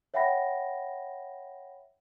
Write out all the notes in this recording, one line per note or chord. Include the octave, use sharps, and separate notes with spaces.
C#5 E5 F#5 G5 B5 A#6